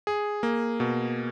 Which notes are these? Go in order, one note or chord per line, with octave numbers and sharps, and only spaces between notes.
G#4
A#3
B2